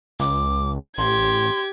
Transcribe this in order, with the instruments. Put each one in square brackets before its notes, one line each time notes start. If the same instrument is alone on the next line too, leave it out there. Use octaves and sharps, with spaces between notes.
[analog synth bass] C#2 [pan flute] D6
[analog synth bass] A1 [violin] G4 G#6 [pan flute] C6